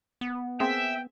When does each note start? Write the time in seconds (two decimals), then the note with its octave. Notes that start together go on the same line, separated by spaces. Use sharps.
0.21 B3
0.60 A#3 C4 G#4 E5 G5